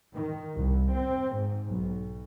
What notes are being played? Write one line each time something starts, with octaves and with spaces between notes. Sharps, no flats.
D#3
C2
C4
G#2
B1